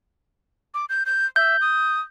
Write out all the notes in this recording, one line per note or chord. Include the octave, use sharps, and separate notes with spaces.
D6
G6
G6
E5 G6
D#6